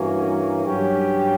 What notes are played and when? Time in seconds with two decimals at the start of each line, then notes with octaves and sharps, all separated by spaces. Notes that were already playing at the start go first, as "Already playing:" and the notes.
Already playing: G2 E3 A#3 C#4 F#4
0.64 G2 F#3 C#4 G4